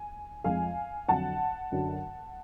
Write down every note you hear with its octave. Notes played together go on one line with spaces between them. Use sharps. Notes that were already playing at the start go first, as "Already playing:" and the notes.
Already playing: G#5
F2 F3 G#3 F5 G#5
F2 D3 F#3 F#5 A5
F#2 D3 F#3